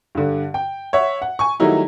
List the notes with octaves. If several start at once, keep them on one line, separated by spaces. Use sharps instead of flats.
G2 D3
G5
C#5 E5 F#5
F#5
G#5 C#6
D#3 F#3 G3 A3 D#4 E4